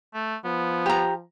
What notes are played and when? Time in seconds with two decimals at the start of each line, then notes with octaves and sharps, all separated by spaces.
0.14 A3
0.44 F3 B3
0.86 G4 A#5